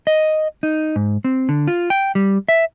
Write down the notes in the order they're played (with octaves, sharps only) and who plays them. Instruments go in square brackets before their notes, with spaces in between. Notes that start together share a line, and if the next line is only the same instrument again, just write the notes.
[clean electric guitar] D#5
D#4
G#2
C4
D3
F4
G5
G3
E5